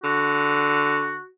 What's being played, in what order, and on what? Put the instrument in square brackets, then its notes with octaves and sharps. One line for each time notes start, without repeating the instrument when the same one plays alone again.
[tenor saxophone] D3 [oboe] F#4